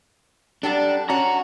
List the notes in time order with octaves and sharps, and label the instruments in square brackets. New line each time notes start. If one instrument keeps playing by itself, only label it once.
[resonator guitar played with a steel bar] F#3 G3 A4 [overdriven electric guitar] D4
[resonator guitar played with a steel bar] C#4 C#5 [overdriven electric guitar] F#4 [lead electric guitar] A#5